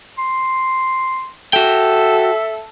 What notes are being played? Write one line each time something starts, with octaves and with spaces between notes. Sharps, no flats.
C6
F#4 A4 E5 G5